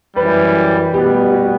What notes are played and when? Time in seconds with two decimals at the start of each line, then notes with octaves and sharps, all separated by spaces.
0.16 F#2 E3 G3 B4
0.93 B2 G3 B3 G4
1.32 F#4